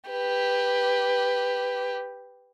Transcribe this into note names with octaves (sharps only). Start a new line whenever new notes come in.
G4 B4